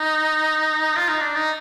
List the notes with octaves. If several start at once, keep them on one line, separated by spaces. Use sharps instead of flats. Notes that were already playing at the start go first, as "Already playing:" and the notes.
Already playing: D#4
F4
D#4
D4
D#4